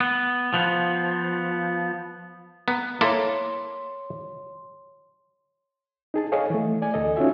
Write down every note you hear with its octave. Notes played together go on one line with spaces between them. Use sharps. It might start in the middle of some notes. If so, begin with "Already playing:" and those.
B3
F3 B3
B3 A#5
A#3 E4 A4 C#5 C6
D#4 G#4 A5
G#4 A4 C#5 D#5 F5 G#5
E3 A3
D5 G#5
D2 A4 D#5
C#4 D#4 F4 F#4 E5 G#5